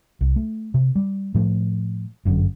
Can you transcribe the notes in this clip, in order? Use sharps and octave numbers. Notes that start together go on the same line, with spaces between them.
C2
A3
C3
G3
A2 F3 A3
G1 F#2 A2 D3